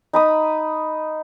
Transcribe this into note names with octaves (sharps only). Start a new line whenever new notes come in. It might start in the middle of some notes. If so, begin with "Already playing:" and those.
D#4 B5 D#6